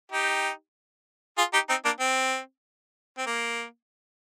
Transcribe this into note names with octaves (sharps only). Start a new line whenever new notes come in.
D#4 G4
F4 G#4
D#4 G4
C4 D#4
A#3 D4
C4
C4
A#3